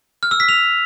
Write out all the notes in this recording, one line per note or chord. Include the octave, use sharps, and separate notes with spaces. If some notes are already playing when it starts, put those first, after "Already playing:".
F6
E6
B6
F7